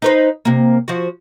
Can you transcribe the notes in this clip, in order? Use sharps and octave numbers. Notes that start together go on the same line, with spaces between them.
D#4 B4 C5
C3 A#3
F3 F#4